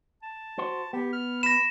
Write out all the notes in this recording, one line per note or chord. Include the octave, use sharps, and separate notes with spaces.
A5
F#4 C5
B3 G4
F6
B5 A#6 E7